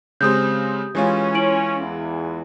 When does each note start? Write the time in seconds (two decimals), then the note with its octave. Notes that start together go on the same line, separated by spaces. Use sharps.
0.21 C#3 G#3 C4 G4 D#6 G6
0.95 E3 G#3 C#4 F4
1.34 E4 D7 F#7
1.80 E2